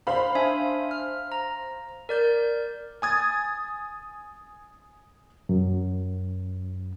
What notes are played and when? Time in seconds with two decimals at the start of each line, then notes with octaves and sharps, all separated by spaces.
0.07 C5 F5 B5
0.35 D4 E5 G#5
0.91 F6
1.32 A#5
2.09 A#4 D5 G6
3.02 G#5 D#6 G#6 A6
5.49 F#2